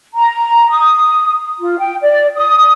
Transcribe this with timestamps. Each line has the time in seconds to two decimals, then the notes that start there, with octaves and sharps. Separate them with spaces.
0.15 A#5
0.71 D#6
1.60 F4
1.79 G5
2.03 D5
2.35 D#6